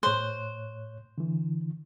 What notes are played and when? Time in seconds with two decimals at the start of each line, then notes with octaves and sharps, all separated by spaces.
0.03 A2 C5 C#5 F#6
1.18 D3 E3